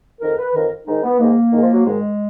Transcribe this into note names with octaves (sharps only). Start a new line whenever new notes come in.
F2 D#3 A#4
B4
F2 D#3 A#4
G#2 D#3 D#4
B3
G#2 D#3 A#3
G#2 D#3
F3
F#3
G#2 D#3 G#3